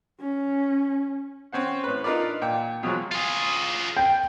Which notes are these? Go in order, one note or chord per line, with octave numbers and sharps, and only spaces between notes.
C#4
C4 C#4 C5 F#5
A2 B4
D4 D#4 F4 A#4 B4 D5
A#2 G5
B2 F3 F#3 G#3
F4 G#4
G5